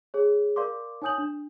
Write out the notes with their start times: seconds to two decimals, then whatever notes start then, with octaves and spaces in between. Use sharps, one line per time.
0.14 G#4 C#5
0.56 A#4 D5 F5 C6 D6
1.02 D#4 C#5 G#5 D#6 G6 F#7
1.18 D4